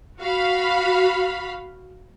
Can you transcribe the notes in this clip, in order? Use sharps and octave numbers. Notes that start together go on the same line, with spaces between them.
F#4 F5 B5